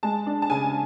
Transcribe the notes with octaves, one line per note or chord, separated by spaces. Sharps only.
G#3 A5
D4
A5
C#3 G#5